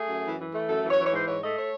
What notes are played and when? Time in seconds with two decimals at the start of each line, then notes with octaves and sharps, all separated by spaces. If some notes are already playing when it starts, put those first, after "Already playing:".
Already playing: A3 G#4
0.09 F#2
0.23 E3
0.38 E3
0.53 A3
0.67 F#2 A4
0.82 E3
0.90 C#5
0.98 E3
1.05 C#5
1.12 G#2 C5
1.26 G#2 C#5
1.42 A3 D#5
1.56 C#5